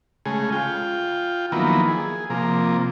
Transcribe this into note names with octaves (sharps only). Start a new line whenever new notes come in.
C#3 G#3 A3 G#4
F4 G5
D#3 F3 F#3 A#3 B3 E4
G#4
C3 F3 A#3